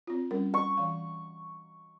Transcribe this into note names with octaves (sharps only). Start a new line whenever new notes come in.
C4 F4
G3 C#4 A#4
C#6
E3 F5